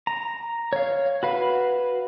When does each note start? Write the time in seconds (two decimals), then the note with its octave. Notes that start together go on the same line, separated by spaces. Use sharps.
0.07 A#5
0.73 C#5 F5
1.23 F#4 B4 F5